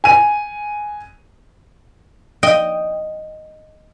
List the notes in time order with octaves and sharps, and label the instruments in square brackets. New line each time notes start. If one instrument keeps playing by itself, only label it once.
[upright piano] G#5 D#7
[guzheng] D#5 G5